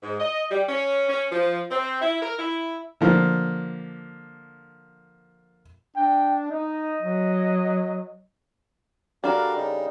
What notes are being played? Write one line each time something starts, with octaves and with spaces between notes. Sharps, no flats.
G#2
D#5
G3
C#4
C#4
F3
C4
E4
A#4
E4
D3 F3 A#3
D4 G5
D#4 D#5
F#3
G3 D4 F#4 A4 A#4 D5 F5
C#3 D#4